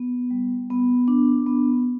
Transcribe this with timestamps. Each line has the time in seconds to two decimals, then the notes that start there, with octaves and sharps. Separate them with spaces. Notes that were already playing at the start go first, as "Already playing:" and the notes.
Already playing: B3
0.30 G3
0.70 B3
1.08 D4
1.46 B3